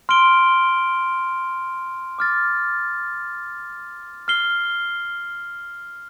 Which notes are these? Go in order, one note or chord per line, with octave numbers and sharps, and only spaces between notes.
C6 F6 D7 G7
D6 F6 A6
F6 C7 G7